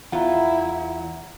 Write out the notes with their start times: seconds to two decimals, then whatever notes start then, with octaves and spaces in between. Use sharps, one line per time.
0.12 E2 E4 F4 F#5 A#5